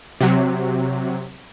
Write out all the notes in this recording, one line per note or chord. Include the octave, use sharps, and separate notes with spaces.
C3 F#3